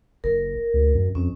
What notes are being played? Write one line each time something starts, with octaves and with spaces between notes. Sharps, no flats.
F#1 A#4
D2
F#2
F2 C#4